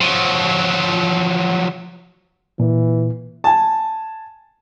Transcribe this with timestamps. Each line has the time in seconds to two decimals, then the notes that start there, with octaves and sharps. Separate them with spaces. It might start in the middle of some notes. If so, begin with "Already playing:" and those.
0.01 F3 F#3
2.60 A#2 E3
3.44 G#5 A5